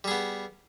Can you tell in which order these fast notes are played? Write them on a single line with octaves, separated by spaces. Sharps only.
G3 G#4 B3